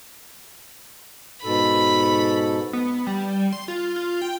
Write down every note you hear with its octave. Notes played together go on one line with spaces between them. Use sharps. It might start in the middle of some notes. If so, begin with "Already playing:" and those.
G#2 B2 A4 B5
B3
G3
C6
F4
F4
G5